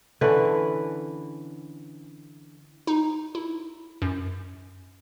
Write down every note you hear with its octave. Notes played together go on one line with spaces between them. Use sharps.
D3 E3 C#4 B4
D#4
E4
F#2